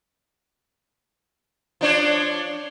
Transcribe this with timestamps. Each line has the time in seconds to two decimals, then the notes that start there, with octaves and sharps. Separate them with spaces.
1.81 F3 D4 C#5